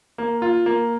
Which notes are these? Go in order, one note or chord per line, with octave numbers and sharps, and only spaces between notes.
A#3
F4
A#3